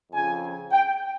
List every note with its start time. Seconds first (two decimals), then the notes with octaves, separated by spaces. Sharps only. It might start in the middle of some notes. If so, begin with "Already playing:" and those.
0.10 F2 C#3 F3 G#5
0.72 G5